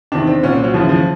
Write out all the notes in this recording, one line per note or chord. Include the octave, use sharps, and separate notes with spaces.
E2 C3 D#3 D4
C4
C2 A#2 C#4
C4
F#3
D#2 C#3 E3 F3
F3